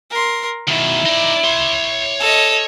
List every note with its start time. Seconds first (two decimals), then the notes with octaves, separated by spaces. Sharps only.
0.10 A#4 C6
0.68 B2 D#3 E4
1.06 D#4 D5
1.44 C#5 C6
2.20 A4 D#5